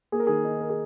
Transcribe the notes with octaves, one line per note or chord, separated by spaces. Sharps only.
A#3 G#4
A#4
D#3 G#4
D#4
A#4
G#4